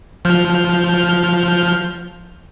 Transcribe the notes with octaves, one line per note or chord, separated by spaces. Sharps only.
F3 F6 G6